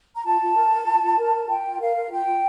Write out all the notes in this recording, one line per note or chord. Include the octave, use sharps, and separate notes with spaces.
A#5
F4 A5
F4
A#4
A#4
F4
F4
A#4
A#4
F4 G5
F4
A#4 F5
A#4
F4 G5
F4